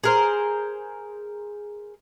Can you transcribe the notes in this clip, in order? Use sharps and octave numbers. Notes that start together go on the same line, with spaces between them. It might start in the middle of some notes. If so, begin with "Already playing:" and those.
G#4 A#4 C5